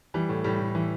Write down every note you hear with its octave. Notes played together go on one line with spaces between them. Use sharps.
E3 G3
A2
A2 G3
A2
E3